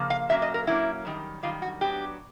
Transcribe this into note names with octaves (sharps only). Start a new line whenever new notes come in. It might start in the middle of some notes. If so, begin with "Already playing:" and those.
Already playing: C#3 F3 A#3
F5
A#2 F#3 A#3 C#4 E5
D#5
A#4
A#2 F#3 A#3 C#4 E4
F#2 D#3 G3
F#2 D#3 G3 F4
F#4
A2 F#3 B3 D4 G4